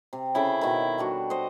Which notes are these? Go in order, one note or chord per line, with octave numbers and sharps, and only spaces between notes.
C3
C#3 E4 A4 G5
B2 D#3
G3 D4 F#4
C5 D#5